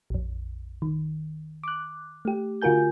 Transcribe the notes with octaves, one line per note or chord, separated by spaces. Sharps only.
A#1 F2
D#3
D6 F#6
A3 G4
D3 F4 F#4 A#4 G#5 G6